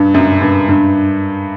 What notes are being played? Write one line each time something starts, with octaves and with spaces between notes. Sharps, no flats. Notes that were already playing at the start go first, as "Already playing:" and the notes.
Already playing: G2
F#2
G2
G2